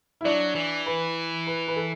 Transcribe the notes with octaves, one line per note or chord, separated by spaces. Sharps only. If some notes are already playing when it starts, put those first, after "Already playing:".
E4
F#3 D4
E3
B4
B4
B4
A4